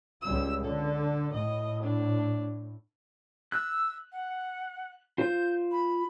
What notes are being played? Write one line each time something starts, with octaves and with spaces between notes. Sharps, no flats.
C#2 G3 E6
D3 A4
A2 D#5
D4
E6 F#6
F#5
F4 C5 G6
B5